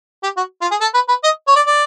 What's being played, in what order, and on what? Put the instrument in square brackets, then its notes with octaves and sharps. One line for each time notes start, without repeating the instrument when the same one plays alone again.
[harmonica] G4
F#4
F4
G#4
A4
B4
B4
D#5
C#5
D5
D5